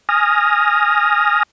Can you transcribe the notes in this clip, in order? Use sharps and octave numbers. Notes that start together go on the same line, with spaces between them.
G#5 D#6 F6 A#6